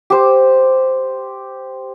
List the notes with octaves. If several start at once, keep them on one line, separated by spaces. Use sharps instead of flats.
G4 C5